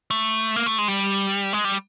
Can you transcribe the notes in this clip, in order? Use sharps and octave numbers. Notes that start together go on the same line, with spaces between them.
A3
A#3
A3
G#3
G3
G#3
G3